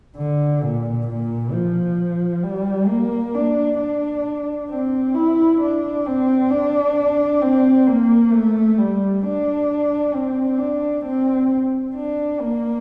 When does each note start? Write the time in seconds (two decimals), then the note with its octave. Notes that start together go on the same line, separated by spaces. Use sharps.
0.17 D3
0.62 A#2
1.08 A#2
1.52 F3
2.43 G3
2.89 A#3
3.34 D4
3.80 D4
4.70 C4
5.15 E4
5.61 D4
6.06 C4
6.51 D4
7.42 C4
7.87 A#3
8.33 A3
8.77 G3
9.23 D4
10.14 C4
10.58 D4
11.05 C4
11.95 D4
12.41 A#3